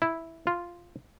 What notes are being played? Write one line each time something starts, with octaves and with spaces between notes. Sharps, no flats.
E4
F4